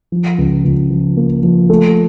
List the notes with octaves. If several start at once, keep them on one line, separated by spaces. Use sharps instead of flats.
F3
C#2
C#2
F3
A#3
F3
A3